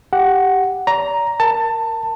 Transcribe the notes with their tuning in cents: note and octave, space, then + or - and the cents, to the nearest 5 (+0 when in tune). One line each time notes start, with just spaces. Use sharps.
G4 +0 F#5 +0
D5 -35 A#5 +5
A#4 +0 A5 +20